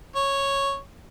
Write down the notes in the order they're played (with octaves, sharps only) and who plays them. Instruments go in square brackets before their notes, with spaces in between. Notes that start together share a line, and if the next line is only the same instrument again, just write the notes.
[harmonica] C#5